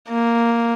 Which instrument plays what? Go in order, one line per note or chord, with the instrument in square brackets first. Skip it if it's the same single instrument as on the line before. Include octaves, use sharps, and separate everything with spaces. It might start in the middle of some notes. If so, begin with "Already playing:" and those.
[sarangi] A#3